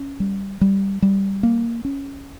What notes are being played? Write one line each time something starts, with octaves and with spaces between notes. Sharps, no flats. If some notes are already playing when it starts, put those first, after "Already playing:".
Already playing: C#4
G3
G3
G3
A#3
C#4